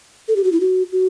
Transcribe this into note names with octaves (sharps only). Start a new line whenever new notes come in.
A4
G4
F#4
E4
F#4
F#4